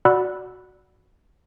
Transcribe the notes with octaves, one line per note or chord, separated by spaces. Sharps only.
F#4 D5 F#5 B5 E6 F#6